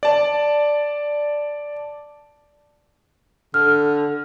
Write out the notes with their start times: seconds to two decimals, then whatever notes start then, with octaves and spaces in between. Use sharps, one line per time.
0.03 D5 A5
3.54 D3 F6